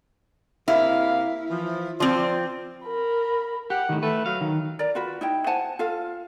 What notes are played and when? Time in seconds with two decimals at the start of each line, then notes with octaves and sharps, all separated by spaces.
0.68 C3 A#3 E4 F5
1.50 E3 F3
2.00 F3 C4 F4 D5
2.85 A#4 B5
3.70 G4 F#5
3.89 A2 D#3
4.03 A3 B4
4.26 F#3 F5
4.41 D#3
4.79 A#4 D5 A#5
4.95 F4 F#4 B4
5.21 D#4 E4 G5
5.47 C5 F#5 G#5 A5
5.79 F4 A4 F5